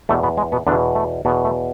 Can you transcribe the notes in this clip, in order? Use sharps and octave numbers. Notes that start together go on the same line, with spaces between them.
E2 B2 A3
B2 B3
G#3
B2 B3
E2 B2 D3 D4
A3
E2 B2 B3
A3